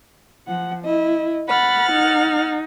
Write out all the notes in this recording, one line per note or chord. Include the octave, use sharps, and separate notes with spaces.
F3 F#5
E4 D#5
F#5 B5 F6 A6
D#4